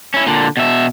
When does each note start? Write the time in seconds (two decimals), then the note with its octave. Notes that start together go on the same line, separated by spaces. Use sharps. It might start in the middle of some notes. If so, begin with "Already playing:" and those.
0.14 C#4 E4
0.27 A#2 D3
0.57 B2 E5